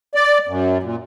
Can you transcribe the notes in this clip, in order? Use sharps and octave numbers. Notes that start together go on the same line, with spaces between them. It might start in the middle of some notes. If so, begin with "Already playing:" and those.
D5
F#2
A#2